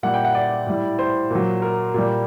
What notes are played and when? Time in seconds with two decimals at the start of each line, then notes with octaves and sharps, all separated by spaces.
0.03 A#2 G3 F#5
0.14 G5
0.25 F#5
0.35 D5
0.67 A2 G3
0.99 C5
1.30 A#2 F#3
1.62 A#4
1.94 A#2 G3